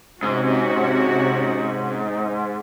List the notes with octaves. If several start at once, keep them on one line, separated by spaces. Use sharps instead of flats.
G#2 C3 C#4 F#4